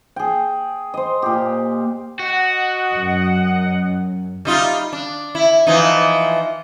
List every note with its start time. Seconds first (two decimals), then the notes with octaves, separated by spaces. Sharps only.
0.16 G#4 G5
0.94 C5 D#5
1.22 A#2 G4
2.20 F#4 D#5 F#5
2.94 F#2
4.45 G3 D#4 F4
4.92 D4
5.35 E4
5.67 E3 F3 D#4